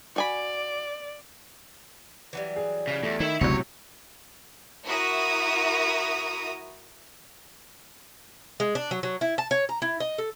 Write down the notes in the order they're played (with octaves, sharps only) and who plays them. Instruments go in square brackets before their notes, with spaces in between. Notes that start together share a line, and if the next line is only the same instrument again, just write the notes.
[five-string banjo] F#4 G#5 B5 [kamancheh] D5
[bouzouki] E3 F#3 G3
[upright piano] G#4
[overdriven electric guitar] C#3
[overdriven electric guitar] E2 [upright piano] A3
[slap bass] D#3 [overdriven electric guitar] E4 E5
[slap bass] F#1 C#2 [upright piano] A2 C3 F#3 [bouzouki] B3 [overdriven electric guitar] C#5
[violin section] E4 F#4 A#4 E5 A#5 D#6
[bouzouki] G#3
D4
F#3
F#3
E4
A5
C#5
A#5
E4
D#5
A4